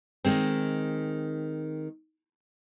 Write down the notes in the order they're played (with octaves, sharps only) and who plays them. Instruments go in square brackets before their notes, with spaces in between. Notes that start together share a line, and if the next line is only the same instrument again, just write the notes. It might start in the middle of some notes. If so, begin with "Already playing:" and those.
[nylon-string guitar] D#3 G#3 C4